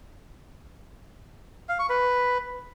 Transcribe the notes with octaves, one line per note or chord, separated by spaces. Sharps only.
F5
C#6
B4